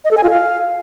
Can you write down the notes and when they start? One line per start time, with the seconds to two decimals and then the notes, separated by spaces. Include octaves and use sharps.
0.05 D#5
0.11 A4
0.17 G#5
0.24 F4
0.30 F5